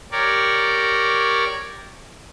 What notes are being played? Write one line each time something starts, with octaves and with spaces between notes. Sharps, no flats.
G4 A#4 C#5 D5